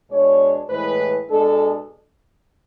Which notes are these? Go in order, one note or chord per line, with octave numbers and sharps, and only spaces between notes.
B2 G#3 D4 C#5
A2 E3 G#3 B4
B2 G#3 D4 A4